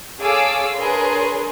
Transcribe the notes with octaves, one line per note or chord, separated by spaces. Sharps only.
G#4 A4 C#5 F5 D6 E6
D4 G#4 A#4 B4 C#5 C6